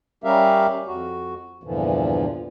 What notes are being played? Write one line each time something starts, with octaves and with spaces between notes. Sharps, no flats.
G3 C#4 G4 A#4 E5 F5
F2 F#4
E2 G2 A#2 D3 E3 F3